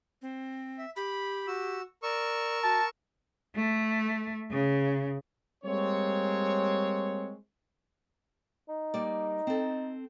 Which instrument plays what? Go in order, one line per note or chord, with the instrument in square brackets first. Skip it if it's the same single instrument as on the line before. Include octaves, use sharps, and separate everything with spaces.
[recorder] C4
[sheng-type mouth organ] E5
[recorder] G4 [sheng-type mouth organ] B5
[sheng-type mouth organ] F#4 E6
[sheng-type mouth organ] A#4 C#6 E6 [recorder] D5
[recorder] F#4 [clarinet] A5
[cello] A3
C#3
[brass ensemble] G3 G#3 A#3 C4 C#5
[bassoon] D#4
[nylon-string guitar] G3 A#3 D5
C4 A4